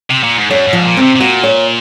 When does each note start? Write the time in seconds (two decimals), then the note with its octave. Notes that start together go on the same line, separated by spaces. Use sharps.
0.10 C3
0.23 A#2
0.37 G#2
0.50 F#2 C#5
0.67 G#2
0.73 F3
0.85 A#2
0.97 C4
1.02 C3
1.16 C3
1.20 A#2 F#4
1.43 C#5